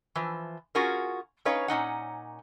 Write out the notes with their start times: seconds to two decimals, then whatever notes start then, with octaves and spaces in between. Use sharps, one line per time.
0.15 E3 F3
0.75 C#4 F4 F#4 G#4 A#4
1.45 C#4 D#4 B4 C#5 F5
1.68 A#2 C#4 D#4 F#5